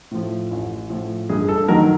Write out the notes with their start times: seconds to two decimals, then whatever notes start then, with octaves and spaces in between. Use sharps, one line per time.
0.11 A2 F3
0.51 A1
0.90 A2 F3
1.29 G2 G#4
1.49 A4
1.68 D#3 F#3 A#4